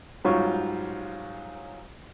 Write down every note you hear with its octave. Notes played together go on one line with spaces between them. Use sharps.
G#2 F#3 G3 C#4 F4 C#6